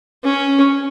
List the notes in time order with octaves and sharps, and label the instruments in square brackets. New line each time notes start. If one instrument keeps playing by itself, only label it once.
[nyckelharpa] C#4